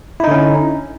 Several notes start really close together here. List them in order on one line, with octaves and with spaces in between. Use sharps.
E4 D#4 D3 C#4